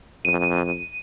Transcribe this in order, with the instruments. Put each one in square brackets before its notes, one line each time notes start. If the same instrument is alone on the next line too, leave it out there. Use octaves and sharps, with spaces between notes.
[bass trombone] F2 [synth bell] D#7